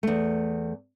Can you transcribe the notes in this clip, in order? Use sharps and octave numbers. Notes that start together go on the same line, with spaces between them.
E2 A3